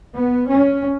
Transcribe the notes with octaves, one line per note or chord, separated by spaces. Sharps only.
B3
C#4